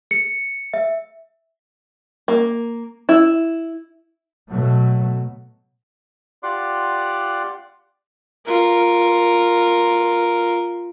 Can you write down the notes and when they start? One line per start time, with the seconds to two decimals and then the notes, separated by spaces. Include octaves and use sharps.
0.11 C#7
0.74 E5
2.28 A#3
3.09 E4
4.50 B2 F#3 A3
6.43 F4 G4 D5 F#5 C6 D6
8.46 F4 A#4